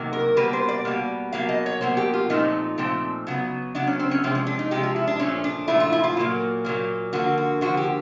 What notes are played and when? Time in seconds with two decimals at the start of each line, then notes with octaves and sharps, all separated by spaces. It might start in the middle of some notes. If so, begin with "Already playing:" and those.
Already playing: C3 D#3 F#3 A#3
0.13 A#4
0.36 B2 G3 A#3 B4
0.53 C5
0.68 D5
0.85 B2 G3 A#3
1.33 B2 F#3 A#3 F5
1.49 D#5
1.66 C#5
1.81 B2 F#3 A#3 C5
1.97 G4
2.14 F4
2.30 A#2 F3 A3 C4 D#4
2.78 A#2 F3 A3 C4
3.27 C#3 F#3 B3
3.75 C#3 F#3 B3 D4
3.87 C#4
3.99 C4
4.11 C#4
4.24 C3 F3 G#3 C4
4.35 C#4
4.47 D4
4.59 D#4
4.71 C3 F3 G#3 G4
4.83 F4
4.96 E4
5.07 D4
5.19 A#2 F3 A3 C#4
5.44 D4
5.68 A#2 F3 A3 E4
5.80 F4
5.92 E4
6.04 F4
6.17 A#2 F#3 A#3
6.64 A#2 F#3 A#3
7.13 D3 F3 A#3 F#4
7.38 F#4
7.61 D3 F3 A#3 F#4
7.77 G4